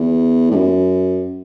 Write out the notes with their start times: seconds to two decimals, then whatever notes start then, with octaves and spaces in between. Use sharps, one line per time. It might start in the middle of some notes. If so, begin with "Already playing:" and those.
Already playing: E2
0.51 A2
0.55 F#2